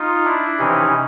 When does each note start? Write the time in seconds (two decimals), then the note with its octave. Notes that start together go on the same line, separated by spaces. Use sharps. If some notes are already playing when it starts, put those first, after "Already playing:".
Already playing: D#4 F4
0.25 D4 E4
0.59 C3 E3 C#4 D#4